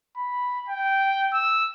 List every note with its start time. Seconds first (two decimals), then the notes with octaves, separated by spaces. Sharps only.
0.17 B5
0.69 G5
1.33 E6